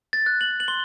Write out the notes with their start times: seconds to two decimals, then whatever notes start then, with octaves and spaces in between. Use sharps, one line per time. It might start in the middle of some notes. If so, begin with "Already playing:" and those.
0.13 A6
0.26 F#6
0.41 F#7
0.60 F#7
0.68 C6 G7